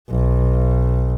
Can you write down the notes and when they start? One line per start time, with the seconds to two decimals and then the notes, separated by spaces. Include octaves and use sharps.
0.10 B1